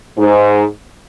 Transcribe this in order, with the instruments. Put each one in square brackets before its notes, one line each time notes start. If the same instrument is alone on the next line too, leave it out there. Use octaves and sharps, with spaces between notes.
[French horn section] G#2